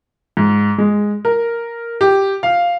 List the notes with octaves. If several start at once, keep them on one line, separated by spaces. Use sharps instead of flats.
G#2
G#3
A#4
G4
F5